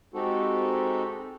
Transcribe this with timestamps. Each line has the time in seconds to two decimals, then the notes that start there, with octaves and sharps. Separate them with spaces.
0.14 G#3 C4 D#4 F#4 G4 A4